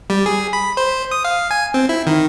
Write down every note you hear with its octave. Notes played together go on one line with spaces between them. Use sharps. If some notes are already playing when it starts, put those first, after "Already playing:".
G3
G#4
B5
C5
D#6
F5
G#5
C4
E4
D#3